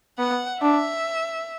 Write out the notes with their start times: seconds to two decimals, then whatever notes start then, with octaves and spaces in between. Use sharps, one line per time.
0.18 B3 F#5
0.62 D4 E5